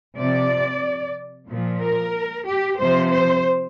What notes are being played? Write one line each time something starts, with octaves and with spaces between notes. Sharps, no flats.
C3 F3 D5
A#2 F3
A#4
G4
C3 F3 C5
C5